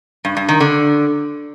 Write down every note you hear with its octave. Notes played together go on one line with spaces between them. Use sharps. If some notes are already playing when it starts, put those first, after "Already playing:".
G2
G2
D#3
D3